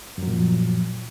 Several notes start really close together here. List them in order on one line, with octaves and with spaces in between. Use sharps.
F#2 F#3 A#2 F3